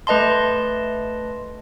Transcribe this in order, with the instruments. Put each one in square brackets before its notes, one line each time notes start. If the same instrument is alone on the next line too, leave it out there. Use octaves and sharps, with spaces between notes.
[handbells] A3 B4 D#5 A5 C6